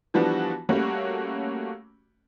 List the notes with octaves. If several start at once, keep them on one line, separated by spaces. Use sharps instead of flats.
E3 F3 G3 B3 D4 F#4
G3 A3 A#3 C#4 F#4